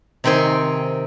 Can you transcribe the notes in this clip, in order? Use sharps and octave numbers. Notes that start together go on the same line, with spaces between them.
C3 D#3 C4 G5 G#5